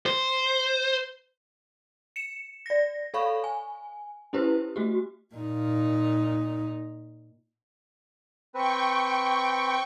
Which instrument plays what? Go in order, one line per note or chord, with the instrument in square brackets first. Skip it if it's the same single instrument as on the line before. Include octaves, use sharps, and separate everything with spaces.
[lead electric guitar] C5
[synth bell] C#7 E7
D5 A#6
A4 C#5 F5 B5 C#6
G#5
C#4 E4 G4 B4 C5
A3 F#4 G4
[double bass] A#2 D#4
[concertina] C4 B4 [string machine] G5 C#6